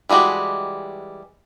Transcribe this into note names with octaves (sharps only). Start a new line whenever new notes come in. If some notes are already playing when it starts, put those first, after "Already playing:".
E3 G3 G#3 F#4 G4